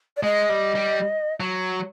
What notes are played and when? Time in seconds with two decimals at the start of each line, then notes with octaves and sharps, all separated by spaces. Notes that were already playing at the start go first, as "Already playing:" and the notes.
0.16 D5
0.23 G#3 D#5
0.49 G3
0.75 G3
1.40 F#3